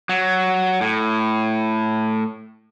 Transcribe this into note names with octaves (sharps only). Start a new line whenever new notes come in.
F#3
A2